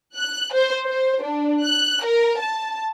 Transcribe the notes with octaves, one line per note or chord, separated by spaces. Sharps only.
F#6
C5
C5
D4
F#6
A#4
A5